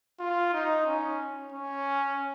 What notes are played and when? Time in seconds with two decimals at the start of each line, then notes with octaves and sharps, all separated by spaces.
0.20 F4
0.53 D#4
0.87 C#4
1.53 C#4